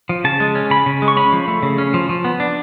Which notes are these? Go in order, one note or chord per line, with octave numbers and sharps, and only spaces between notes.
F3
C#3 A5
G#3
C#4
C#3 B5
C#3
G#3
C#6
C#4 B5
F3
A3
C#3
C#4
F3
F3
B3
D4